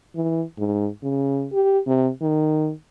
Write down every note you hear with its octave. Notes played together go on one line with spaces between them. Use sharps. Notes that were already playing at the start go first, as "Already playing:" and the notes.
E3
G#2
C#3
G4
C3
D#3